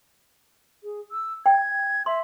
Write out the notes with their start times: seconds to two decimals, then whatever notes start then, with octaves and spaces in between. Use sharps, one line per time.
0.83 G#4
1.12 E6
1.46 G5 G#6
2.06 E5 C6